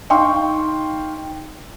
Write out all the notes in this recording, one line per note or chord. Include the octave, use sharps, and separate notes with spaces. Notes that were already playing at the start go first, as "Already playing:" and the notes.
D#4 F5 G5 C6 C#6